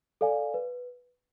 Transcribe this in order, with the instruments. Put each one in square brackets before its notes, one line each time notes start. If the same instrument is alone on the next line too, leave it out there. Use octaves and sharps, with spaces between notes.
[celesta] A4 D5 F5 G#5
B4